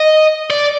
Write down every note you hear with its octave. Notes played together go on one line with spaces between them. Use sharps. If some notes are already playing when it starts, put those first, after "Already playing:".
Already playing: D#5
D5